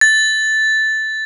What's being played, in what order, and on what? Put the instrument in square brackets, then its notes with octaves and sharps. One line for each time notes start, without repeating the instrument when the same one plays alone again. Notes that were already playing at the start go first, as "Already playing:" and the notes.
[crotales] A6